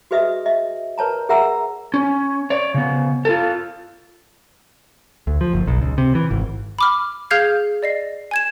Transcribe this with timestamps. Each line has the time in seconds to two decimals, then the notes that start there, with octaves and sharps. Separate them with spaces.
0.11 F#4 G#4 B4 D#5 E5 D#6
0.46 D#5 E5
0.98 A#4 B4 C#5 A5 A#5
1.29 G#4 A#4 E5 F#5 A#5 E6
1.94 C#4
2.50 C#5 D5
2.74 C#3 B3
3.25 F4 A4
5.27 D2
5.41 F3
5.53 F#1
5.67 B1
5.82 C#2
5.98 C3
6.15 E3
6.31 G#1
6.79 B5 D6 F6
7.31 G#4 F5 F6 G6 G#6 C7
7.83 D5 D#5 C7
8.31 G#5 G#6 E7